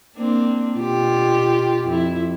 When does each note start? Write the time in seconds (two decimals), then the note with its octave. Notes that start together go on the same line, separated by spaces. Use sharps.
0.16 A#3 C4 D4
0.77 B2 F4 G4
1.85 F2 E4